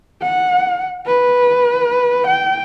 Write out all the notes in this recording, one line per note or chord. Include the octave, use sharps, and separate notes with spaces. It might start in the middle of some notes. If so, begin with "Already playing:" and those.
F#5
B4
G5